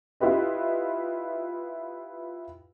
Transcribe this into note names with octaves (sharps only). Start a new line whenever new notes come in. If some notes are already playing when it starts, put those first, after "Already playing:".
E4 F4 G4 B4 D#5